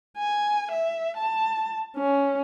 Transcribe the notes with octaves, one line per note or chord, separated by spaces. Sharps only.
G#5
E5
A5
C#4